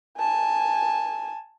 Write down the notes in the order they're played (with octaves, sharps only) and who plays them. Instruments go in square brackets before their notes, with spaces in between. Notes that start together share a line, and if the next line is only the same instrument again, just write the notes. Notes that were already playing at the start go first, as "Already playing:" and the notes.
[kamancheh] G#5 A5